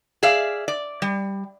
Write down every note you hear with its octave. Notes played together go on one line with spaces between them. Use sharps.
G#4 D5 E5 F5
D5
G3